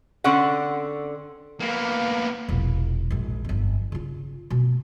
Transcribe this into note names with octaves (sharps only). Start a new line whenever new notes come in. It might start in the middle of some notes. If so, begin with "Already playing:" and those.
D3 C4 C#4 D5 F#5
A#3 B3
E1 A#1
A#1 G#2
G1 F2
C#3 F4
B2 A3